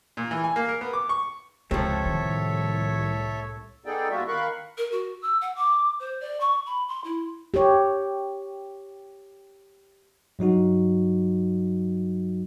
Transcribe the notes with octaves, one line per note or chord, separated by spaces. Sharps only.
A#2
E3
G#5
A#3
A#4
B3
D6
C#6
C#2 C3 F3 A4 C#5 E5
C2 A2 D#3
B3 D#4 G#4 A4 D5 G5
D#2 G3 B3 F4 F#4 E5
D#3 A#4 F5 B5 C#6 F#6
A#4
F#4
E6
F#5
D6
C5
D5
C#6
B5
C6
E4
G4 C#5
G2 F#3 D#4 F#4